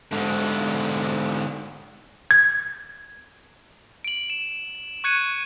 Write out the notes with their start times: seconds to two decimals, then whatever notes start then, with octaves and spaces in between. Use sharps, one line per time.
0.12 G#2 D3
2.31 G#6
4.04 D7 F#7
4.30 E7
5.04 C#6 F#6 G#6 C#7 D#7